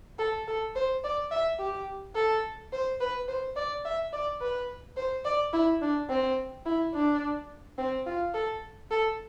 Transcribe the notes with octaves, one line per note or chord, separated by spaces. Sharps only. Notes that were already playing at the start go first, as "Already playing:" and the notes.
A4
A4
C5
D5
E5
G4
A4
C5
B4
C5
D5
E5
D5
B4
C5
D5
E4
D4
C4
E4
D4
C4
F4
A4
A4